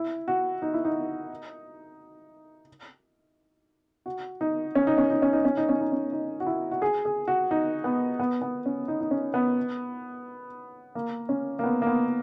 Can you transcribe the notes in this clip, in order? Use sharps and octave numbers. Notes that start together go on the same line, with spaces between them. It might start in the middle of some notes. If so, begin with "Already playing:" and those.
Already playing: E4
F#4
D#4
E4
D#4
F#4
D#4
C#4
D#4
C#4
D#4
C#4
D#4
C#4
D#4
C#4
D#4
C#4
D#4
F#4
E4
F#4
G#4
G#4
F#4
D#4
B3
B3
B3
C#4
D#4
D#4
C#4
B3
A#3
C#4
A#3
B3
A#3
B3